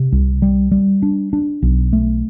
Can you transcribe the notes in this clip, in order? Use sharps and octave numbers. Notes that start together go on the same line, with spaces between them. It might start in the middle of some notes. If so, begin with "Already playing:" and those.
Already playing: C3
C2
G3
G3
D4
D4
B1
A3